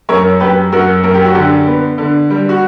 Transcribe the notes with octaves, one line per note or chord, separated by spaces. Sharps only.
F#2 A#4 C#5
F#2 G4 B4
F#2 F#4 A#4
F#2 A#4
G4
F#4
D3 G4
B3
D3
G3
F#4